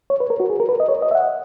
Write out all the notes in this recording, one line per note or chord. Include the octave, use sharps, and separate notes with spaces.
C#5
B4
A#4
F#4
G#4
A#4
B4
D#5
C#5
D#5
E5
F#5